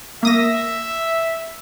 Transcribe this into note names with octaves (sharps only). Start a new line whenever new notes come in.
A#3 E5 D#6 A#6